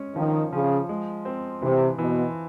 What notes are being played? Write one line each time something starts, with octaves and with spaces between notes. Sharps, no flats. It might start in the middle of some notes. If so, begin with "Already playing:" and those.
Already playing: G#3 C#4
D#3 F3
C#3 F3
G#3
C4
C3 E3
B2 E3